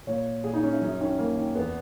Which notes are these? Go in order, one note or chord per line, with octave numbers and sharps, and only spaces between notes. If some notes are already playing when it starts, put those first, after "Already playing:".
A#2 C#5
A#2 G#4
D#4
C#4
E4
F#2 C#4
D#3 C#4
F#2 A#3
D#3
E2 B3